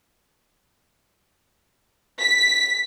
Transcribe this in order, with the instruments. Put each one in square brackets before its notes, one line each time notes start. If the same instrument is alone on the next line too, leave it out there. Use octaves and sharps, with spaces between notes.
[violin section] B6